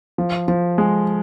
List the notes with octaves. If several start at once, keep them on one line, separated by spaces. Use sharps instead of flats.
F3
F3
G#3